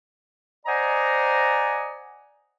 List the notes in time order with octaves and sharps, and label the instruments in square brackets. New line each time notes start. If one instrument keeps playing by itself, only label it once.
[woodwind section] C5 D5 D#5 F#5 G#5 A#5